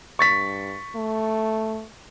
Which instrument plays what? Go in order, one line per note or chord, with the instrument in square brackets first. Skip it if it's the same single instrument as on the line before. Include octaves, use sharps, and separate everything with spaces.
[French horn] G2 [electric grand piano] C#6 A6 B6
[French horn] A3